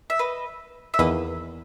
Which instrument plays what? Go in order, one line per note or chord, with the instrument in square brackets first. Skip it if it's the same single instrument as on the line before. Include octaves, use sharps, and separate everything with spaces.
[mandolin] E5
B4 D#5
E5
[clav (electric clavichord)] E2 D#3 A#3 [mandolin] B4 D#5